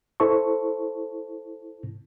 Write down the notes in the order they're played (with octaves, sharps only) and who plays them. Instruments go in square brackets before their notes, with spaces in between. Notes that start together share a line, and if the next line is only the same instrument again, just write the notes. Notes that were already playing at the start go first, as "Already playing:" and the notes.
[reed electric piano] E4 A4 C5 A5 C#6